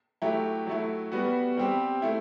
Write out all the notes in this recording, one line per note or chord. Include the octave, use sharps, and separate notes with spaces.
F#3 A3 E4 G4
F#3 A3 E4
G3 B3 F#4
G3 C4 G4
A3 E4